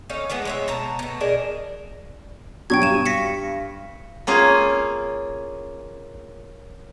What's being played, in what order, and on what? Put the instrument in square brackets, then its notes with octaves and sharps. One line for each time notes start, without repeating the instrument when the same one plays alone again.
[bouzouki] C#4 D#4 A4 F5
E3 G#3 A3 B3
G#3 C#5 E5
B2 A5 A#5
B2 A3
D4 D#4 G#4 A#4
[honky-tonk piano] B2 F#3 D4 [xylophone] G5 C#6 G#6
[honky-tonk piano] G2 [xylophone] D#7 E7
[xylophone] A#6 B6 C#7
[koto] A#3 C#4 F4 G#4